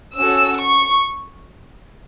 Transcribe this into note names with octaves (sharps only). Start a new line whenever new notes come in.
C#4 F#4 A4 E6
C#6